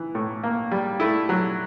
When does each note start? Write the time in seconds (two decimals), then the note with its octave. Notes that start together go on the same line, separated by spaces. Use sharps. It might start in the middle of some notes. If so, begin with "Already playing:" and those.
Already playing: E3
0.15 A2
0.43 A#3
0.71 G3
1.00 A3 E4
1.29 F#3